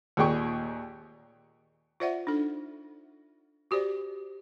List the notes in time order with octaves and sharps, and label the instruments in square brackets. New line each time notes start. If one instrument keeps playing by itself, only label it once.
[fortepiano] D#2 A#2 G#4 G5 C#6
[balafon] F4 C5 D5 E5 F#5
D4 D#4 A4
F#4 G4 C5 D5